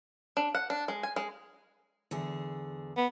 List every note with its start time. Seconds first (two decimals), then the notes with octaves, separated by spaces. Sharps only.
0.37 D4
0.55 F#5
0.70 D4
0.88 G#3
1.03 G#5
1.16 G#3
2.11 E2 D3 G#4
2.97 B3